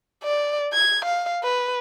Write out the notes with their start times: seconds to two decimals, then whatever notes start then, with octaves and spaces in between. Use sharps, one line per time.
0.24 D5
0.74 G#6
1.05 F5
1.44 B4